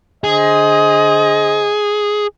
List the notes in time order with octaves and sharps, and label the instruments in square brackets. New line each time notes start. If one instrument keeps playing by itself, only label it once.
[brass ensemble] D3 C5 D#5 [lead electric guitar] G#4